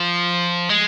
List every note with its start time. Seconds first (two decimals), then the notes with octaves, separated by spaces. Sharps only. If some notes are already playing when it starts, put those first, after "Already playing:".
Already playing: F3
0.69 G#3